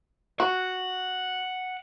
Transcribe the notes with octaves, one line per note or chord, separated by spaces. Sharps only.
F#4 F#5